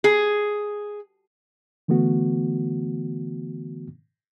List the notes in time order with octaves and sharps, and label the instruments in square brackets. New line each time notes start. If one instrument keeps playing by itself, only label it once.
[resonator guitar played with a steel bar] G#4
[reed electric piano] D3 E3 A3 B3 F#4